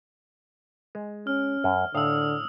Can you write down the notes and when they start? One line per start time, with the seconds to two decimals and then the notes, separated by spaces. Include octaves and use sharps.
0.95 G#3
1.27 C#4 F6
1.64 F#2
1.95 A2 D3 F5 D#6 E6